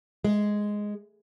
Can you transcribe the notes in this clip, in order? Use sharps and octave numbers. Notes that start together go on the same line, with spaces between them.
G#3